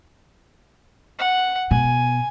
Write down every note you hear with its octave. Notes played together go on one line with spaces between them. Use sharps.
F#5
B2 G#5